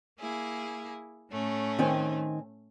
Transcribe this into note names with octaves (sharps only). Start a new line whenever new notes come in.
A#3 E4 G#4
A2 A3 C#4
D#3 C4 G#5